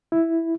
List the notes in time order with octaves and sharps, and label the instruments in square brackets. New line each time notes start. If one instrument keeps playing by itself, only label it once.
[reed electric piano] E4